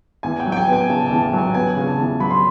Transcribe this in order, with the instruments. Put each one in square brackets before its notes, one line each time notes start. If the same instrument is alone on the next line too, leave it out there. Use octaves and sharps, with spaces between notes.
[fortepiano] E2 [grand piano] G#5
[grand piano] G5
[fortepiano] F#3
[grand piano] G5
G#5
[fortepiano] B3
[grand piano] G#5
[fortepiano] C#3 [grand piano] A5
[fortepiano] E2 [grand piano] A5
[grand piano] A5
[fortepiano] F#3
[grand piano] G#5
[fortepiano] B3 [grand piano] G#5
[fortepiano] C#3
[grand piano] A5
[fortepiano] E2
[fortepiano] F#3 [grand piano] B5
[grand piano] C6